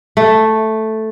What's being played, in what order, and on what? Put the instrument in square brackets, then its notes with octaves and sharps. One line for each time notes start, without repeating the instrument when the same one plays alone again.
[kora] A3